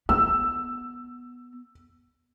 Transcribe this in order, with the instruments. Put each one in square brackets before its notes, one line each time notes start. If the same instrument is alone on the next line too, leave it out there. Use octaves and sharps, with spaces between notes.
[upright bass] B3 [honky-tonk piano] E6